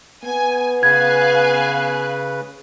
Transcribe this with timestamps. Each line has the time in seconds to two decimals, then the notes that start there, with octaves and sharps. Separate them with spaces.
0.24 B3 G#5
0.83 C#3 B4 F5 G#5 F#6 G#6